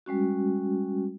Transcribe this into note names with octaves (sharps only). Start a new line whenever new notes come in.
G3 G#3 C#4 F#4